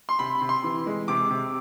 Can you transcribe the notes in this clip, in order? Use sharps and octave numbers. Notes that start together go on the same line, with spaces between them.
C6
C3 B5
C3
C6
E3
G#3
C3 D6
C3